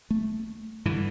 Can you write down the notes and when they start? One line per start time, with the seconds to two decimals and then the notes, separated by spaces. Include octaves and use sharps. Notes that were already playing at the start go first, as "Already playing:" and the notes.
0.10 A3
0.85 G2 D3 E3